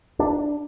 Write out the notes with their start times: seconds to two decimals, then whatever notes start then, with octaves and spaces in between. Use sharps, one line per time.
0.19 D4